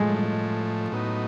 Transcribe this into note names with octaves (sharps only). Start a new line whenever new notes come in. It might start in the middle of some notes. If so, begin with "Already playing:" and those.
Already playing: A2 F3 G#3 A3
A2 F#3 B3 D#4